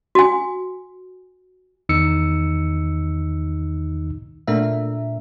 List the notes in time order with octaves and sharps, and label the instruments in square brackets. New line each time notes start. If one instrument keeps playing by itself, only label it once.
[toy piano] F#4 G#5
[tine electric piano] E2 D#3 D#4 E6 C#7
[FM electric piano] A#2 A3 D4 A#4 E5